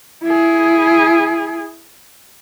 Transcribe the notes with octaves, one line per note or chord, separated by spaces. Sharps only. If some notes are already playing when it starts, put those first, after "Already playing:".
E4 G#4